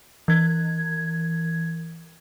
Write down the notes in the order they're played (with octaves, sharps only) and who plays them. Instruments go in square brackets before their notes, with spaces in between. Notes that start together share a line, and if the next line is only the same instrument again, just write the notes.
[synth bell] E3 G#6